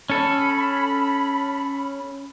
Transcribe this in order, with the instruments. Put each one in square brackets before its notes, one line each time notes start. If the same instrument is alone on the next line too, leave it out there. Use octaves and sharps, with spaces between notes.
[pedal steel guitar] C#4 A4 [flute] B5